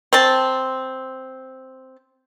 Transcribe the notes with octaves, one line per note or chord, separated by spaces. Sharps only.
C4 A5